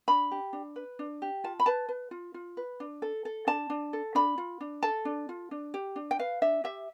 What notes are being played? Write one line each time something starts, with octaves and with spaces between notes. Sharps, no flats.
D4 B5
G4
D4
B4
D4
G4
F4 A5
B5
B4 A5
B4
F4
F4
B4
D4
A4
A4
D4 A5
D4
A4
D4 B5
F4
D4
A4 A5
D4
F4
D4
G4
D4
G5
B4 F5
D4 E5
G4 E5